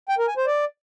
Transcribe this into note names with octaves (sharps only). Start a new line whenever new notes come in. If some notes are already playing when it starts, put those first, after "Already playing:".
G5
A#4
G#5
C5
D5